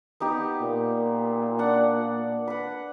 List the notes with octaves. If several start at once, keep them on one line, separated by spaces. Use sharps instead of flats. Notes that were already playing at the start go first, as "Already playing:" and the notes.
B3 D#4 G4
A#2
D4 D5 F#5
B4 F#5